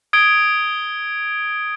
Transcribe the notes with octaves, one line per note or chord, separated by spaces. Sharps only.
D#6 G#6 D7 G7